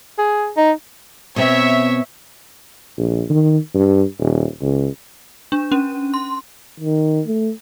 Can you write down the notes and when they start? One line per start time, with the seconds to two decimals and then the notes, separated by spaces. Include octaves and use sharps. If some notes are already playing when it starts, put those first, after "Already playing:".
0.18 G#4
0.57 D#4
1.36 B2 C4 C#5 E5
2.98 A#1
3.29 D#3
3.74 G2
4.19 D#1
4.61 C#2
5.52 D4
5.72 C#4
6.14 C6
6.80 D#3
7.27 A3